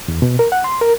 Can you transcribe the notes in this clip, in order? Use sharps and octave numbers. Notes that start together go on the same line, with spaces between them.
E2
B2
A#4
F#5
C6
A#4